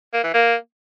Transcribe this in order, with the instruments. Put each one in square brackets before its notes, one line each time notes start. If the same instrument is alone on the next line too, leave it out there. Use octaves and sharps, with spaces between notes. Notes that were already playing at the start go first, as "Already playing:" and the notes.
[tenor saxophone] A#3
E3
A#3